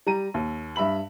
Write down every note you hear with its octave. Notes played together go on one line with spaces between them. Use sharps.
G3 A#5 D#7
D#2
G2 E5 B5 F#7